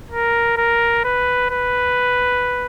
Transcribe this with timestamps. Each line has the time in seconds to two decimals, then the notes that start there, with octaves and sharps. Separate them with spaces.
0.11 A#4
0.57 A#4
1.04 B4
1.50 B4